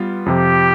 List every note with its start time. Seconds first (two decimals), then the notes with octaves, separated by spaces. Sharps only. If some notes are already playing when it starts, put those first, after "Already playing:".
Already playing: G3 B3 F4
0.26 F2 C3 F3 G4